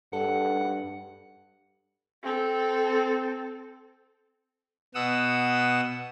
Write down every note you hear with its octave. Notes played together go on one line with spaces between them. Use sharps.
G2 A4 F#5
C4 A4
B2 F#5 D#6 E6